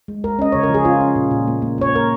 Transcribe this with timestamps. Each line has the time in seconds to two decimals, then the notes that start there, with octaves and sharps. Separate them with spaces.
0.08 G#3
0.24 G#3 A#4
0.39 C#4 D#5
0.52 C#3 C#5
0.63 A#4
0.69 F3
0.74 G#4
0.85 C#4 F4
1.01 C#4
1.16 A#2
1.31 A#2
1.47 A#3
1.62 A#3
1.78 A#3 C#5
1.93 A#3 A#4